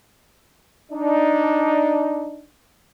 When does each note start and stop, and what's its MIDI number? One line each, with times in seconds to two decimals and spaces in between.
0.91 2.47 62
0.91 2.47 63